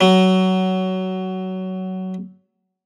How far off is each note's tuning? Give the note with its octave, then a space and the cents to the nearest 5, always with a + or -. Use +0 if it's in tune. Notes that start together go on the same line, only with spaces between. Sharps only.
F#3 +15